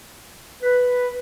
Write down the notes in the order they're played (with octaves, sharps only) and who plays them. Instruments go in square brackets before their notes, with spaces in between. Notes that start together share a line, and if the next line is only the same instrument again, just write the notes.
[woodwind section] B4